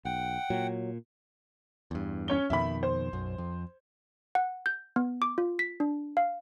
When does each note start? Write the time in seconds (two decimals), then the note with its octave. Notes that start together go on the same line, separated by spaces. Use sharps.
0.05 B1 F#5 G5
0.50 A#2 F#3
1.91 E2 G2
2.28 C#4 C#5 G7
2.50 F2 B2 D#3 E5 B5
2.83 C5
3.13 B1 F#2
3.38 F2
4.35 F#5
4.66 G6
4.96 B3
5.22 D6
5.38 F4
5.59 B6
5.80 D4
6.17 F5